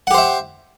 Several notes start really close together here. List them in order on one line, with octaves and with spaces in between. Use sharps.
F#5 G4 C5 E5